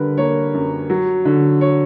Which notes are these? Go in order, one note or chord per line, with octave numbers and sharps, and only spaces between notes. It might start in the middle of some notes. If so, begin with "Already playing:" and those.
Already playing: D3 G3 A#4 B4
A#3 C#5
F#2
F#3
D3
C#5